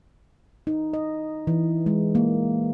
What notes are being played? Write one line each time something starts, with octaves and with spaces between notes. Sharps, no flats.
D#4
D#5
E3
G#3
A#3